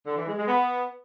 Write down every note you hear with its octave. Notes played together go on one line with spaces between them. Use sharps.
D3
E3
G#3
G#3
B3